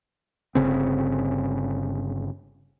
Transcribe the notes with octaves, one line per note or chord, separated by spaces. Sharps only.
G1 C#3 C4